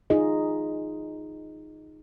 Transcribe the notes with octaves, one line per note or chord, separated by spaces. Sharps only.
D#4 F4 G#4 D#5